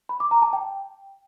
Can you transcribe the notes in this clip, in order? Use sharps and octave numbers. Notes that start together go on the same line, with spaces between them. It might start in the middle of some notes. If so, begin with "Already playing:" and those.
B5
D6
A#5
A5
G5